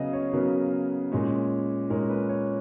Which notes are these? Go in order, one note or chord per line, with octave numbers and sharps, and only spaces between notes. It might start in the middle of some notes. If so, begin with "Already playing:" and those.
Already playing: C#3 F#3 B3 D#5 F5
C#5
C#3 F#3 B3 A#4
A#2 G#3 C#4
A#2 G#3 C#4 A#4
B4
C#5